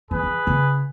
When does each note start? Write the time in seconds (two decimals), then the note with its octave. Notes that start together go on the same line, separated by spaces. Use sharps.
0.11 E3 G#4 B4
0.23 E3
0.47 C#3